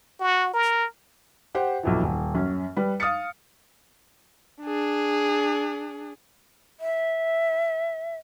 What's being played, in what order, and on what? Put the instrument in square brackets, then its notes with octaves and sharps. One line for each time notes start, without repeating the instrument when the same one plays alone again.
[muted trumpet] F#4
A#4
[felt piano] G4 C5 F#5
B1 F2 E3
D#1
F#2 C#4
G3 B4
F5 D#6 F6 A6 C#7
[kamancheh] D4 G#4
[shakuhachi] E5